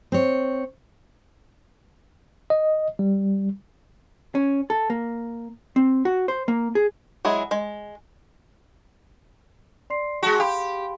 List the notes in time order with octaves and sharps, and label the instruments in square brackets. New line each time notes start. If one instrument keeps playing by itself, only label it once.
[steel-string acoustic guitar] C4 C#5
[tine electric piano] D#5
G3
[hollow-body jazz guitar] C#4
A4
A#3
C4
F#4
C5
A#3
G#4
[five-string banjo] F#3 G#3 E4 G#4
G#3
[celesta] D5 C6 C7
[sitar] G#3 F#4 [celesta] A5 C#6
[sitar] G4 [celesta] F5 B5 C6